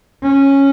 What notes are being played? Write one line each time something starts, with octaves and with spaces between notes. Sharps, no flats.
C#4